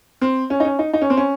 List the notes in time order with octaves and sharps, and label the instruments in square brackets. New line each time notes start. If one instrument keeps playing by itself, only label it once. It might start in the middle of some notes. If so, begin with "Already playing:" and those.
[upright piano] C4
C#4
D#4
C#4
D#4
D#4
C#4
C4
C#4